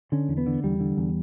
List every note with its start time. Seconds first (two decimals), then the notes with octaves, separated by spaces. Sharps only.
0.12 D3 C#4
0.29 E2
0.38 B3
0.46 D3
0.64 E2 G3
0.80 D3
0.97 E2